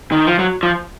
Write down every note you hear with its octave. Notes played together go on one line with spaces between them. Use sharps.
D#3
F3
F#3
F3